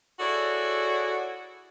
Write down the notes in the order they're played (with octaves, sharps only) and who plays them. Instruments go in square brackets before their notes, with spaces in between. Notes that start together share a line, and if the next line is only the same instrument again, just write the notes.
[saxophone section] E4 F#4 G#4 A4 C#5 D5